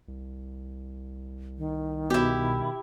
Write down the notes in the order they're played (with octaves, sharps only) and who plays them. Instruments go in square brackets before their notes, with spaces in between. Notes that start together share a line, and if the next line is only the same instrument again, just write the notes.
[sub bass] C2
[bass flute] D#3
[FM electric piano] B2 [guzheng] E4 G4